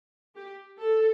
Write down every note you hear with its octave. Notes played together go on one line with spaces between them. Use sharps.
G4
A4